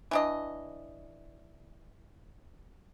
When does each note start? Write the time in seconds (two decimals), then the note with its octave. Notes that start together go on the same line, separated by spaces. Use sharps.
0.11 E3 D4 D#5